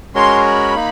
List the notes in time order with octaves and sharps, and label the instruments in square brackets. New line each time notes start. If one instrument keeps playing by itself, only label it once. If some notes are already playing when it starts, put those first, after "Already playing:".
[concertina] G#3 C#4 F#4 A#4 C#5 [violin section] C6
[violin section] B5
[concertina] A#3 D#4